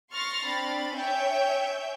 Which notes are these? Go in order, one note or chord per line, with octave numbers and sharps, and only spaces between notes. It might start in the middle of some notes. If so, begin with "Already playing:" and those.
C6 C#6 F6 A6 A#6 C7
C4 D4 B5 A6
C#5 E5 G5 G#5 G6